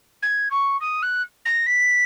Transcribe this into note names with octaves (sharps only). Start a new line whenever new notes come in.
G#6
C#6
D#6
F#6
A#6
B6